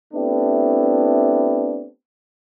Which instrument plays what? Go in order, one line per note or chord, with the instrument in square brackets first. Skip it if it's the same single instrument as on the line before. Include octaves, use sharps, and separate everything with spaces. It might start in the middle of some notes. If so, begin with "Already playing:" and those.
[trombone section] A3 B3 C4 D4 E4 G4